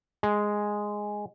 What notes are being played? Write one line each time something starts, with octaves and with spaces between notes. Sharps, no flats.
G#3